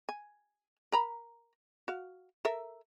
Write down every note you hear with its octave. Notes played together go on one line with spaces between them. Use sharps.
G#5
A#4 A#5 B5
F#4 F5
A4 A#4 E5